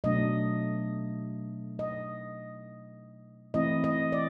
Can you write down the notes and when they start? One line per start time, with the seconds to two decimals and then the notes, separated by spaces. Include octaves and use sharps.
0.04 B2 F#3 A3 D4 D#5
1.79 D#5
3.54 E3 A3 C4 E4 D#5
3.84 D#5
4.12 D5